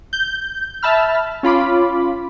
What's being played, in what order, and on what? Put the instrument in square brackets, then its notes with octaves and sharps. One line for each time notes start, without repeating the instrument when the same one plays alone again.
[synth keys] G6
E5 A5 B5 F6
C#4 F4 B5 D6